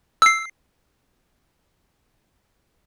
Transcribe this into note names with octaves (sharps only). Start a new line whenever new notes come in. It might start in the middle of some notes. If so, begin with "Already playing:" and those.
E6 C7